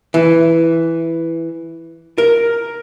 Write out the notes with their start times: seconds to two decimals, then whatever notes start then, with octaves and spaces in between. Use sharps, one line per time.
0.14 E3
2.18 A#4